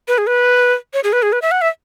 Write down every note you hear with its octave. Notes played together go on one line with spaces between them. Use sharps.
B4
G#4
B4
C#5
G#4
B4
G#4
B4
E5
F#5
E5